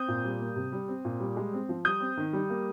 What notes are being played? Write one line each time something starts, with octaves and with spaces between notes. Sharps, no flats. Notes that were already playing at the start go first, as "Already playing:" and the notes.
Already playing: C4 D#6 G6
A#2
G3
A#3
C3
G3
C4
A#2
G3
G#3
C4
F3
G3 D#6 G6
C4
D#3
G3
A#3